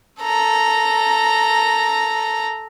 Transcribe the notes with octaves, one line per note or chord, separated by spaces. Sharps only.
A4 A#5